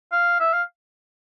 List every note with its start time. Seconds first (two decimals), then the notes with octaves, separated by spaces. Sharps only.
0.12 F5
0.40 E5
0.53 F5